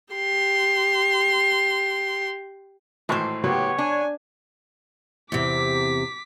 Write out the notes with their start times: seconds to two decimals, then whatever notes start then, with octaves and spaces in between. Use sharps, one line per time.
0.14 G4 C6
3.09 G#1 A2 E3 C5 C#6
3.44 C#3 F#3 B3 G4 C#5
3.78 D4 G#5
5.32 E2 C3 D6 B6